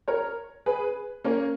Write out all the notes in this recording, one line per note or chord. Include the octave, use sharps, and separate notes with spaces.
A#4 C#5
G#4 B4
A#3 C#4